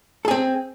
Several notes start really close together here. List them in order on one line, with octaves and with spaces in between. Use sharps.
A4 G#4 C4